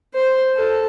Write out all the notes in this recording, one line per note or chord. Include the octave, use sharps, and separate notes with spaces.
C5
A4